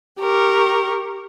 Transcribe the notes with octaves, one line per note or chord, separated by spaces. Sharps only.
G4 A#4 C#6